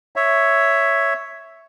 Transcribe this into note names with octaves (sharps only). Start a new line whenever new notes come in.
C#5 E5